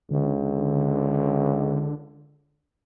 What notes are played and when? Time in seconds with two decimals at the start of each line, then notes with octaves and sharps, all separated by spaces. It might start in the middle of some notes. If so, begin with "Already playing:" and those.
0.11 C#2 D3